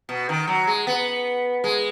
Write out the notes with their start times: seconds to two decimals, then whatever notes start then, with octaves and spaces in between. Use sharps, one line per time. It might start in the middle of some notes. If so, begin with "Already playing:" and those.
0.09 B2
0.29 D#3
0.47 F#3
0.67 G#3
0.87 B3
1.64 G#3